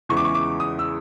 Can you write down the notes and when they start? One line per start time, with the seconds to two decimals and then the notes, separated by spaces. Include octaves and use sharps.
0.09 E2 C#3 E3 G#3 C#6
0.17 D6
0.24 C#6
0.35 D6
0.60 D#6
0.79 E6